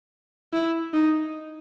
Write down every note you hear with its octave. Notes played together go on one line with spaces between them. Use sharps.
E4
D#4